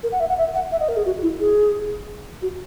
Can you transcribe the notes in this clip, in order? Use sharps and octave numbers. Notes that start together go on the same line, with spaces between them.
A#4
F#5
E5
F#5
E5
F#5
E5
D#5
A#4
G#4
F#4
E4
G#4
F#4